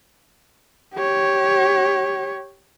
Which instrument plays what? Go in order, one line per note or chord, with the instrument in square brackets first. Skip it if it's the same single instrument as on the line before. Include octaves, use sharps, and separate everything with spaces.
[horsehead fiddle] G4 C#5